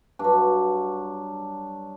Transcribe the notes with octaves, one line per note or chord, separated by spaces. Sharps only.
G2 F#3 D4